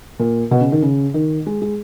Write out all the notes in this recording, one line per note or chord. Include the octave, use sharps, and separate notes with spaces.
A#2
B2
C#3
D#3
C#3
D#3
G#3
G#3